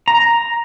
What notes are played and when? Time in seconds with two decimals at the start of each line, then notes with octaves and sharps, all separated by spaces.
0.08 A#5